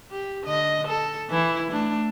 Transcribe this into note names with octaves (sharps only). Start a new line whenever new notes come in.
G4
D3 D#5
A4
E3 E4
A3 D4